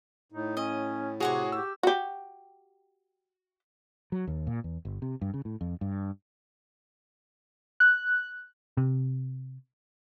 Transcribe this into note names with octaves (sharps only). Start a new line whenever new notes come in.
A2 D#4
C#4 D#5
C3 F#4 G#4 C#5 F#5 C#6
G4 E6
F#4 G4
F#3
D#2
A#2
E2
G1
C3
G2
C#3
A2
F2
G2
F#6
C3